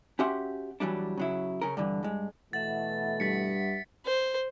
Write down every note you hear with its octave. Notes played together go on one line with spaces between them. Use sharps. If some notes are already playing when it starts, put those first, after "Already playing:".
C#4 F#4 G4 E5 F#5 C6
E3 F#3 G3 D4
C#3 F#3 E4
C#3 C#4 A#4
G2 D3 E3
G2 G#3
B2 E3 A3 E5 F#5 A6
G2 A6 B6 C#7
C5